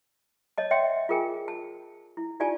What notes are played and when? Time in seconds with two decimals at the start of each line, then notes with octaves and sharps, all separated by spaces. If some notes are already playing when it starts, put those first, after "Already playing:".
0.58 C#5 D#5 A5
0.71 C#5 E5 F#5 G5 C6
1.09 F4 G#4 A#4 G5 G#5
1.48 A5
2.17 E4
2.40 D#4 F4 G4 D5 G#5 A5